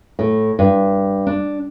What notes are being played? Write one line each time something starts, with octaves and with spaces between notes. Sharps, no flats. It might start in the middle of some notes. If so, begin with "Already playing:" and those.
A2
G2
D4